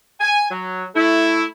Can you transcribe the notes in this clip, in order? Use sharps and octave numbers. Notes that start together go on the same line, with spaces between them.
G#5
F#3
A3 E4